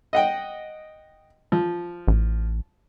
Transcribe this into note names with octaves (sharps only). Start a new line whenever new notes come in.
D#5 F#5 G5
F3
A1